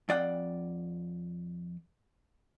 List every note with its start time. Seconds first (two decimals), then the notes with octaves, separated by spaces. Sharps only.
0.09 F2 D5 F#5 G5